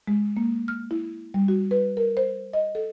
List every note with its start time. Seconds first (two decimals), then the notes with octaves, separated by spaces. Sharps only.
0.07 G#3
0.37 A#3
0.68 F6
0.91 E4
1.34 G3
1.48 F#4
1.71 B4
1.97 A#4
2.17 C5
2.53 D#5
2.75 A4